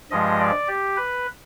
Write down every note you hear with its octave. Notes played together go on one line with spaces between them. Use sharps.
G2 F3 G#3 D#5
D5
G4
B4